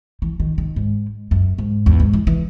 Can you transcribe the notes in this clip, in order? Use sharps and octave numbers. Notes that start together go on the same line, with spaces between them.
E3
D#3
D#3
G#2
F#2
G#2
E2
G#2
E3
E3